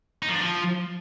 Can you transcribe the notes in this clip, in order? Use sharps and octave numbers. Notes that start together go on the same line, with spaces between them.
D#4
F3
D4
F3